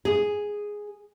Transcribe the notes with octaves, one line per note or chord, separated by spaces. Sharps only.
G#4